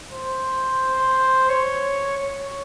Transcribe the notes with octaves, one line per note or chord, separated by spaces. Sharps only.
C5
C#5
C#5